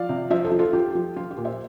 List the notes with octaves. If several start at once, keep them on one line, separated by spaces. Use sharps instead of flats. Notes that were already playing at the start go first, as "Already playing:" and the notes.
Already playing: F3 D5 F5
C3
F3 C5 E5
A4 C5
F3
F4 A4
F3 G4
F3
F3 F4
G4
A#2
C5 E5